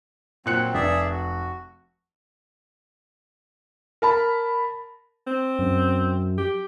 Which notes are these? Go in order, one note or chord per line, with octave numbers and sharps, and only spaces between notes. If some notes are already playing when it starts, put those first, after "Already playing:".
A#2 F#3 C4 F#6 C#7
F1 G#4 D5 E5
F#4
A#4 A5 B5
C4
F#2
G4